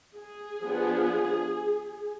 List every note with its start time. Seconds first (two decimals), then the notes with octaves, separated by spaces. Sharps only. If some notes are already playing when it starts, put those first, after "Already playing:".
0.16 G#4
0.62 F3 B3 D4